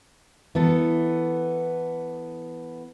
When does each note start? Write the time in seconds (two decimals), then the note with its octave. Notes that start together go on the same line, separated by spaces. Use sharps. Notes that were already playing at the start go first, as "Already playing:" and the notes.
0.55 E3 B3 A4